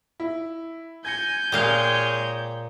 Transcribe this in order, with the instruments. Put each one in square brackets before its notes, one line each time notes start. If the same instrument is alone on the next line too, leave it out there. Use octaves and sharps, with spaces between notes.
[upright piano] E4
[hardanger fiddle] G#5 [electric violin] G6 [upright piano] G#6 A#6 C#7
[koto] A#2 A#3 F5 [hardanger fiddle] G#3 C#5 [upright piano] G4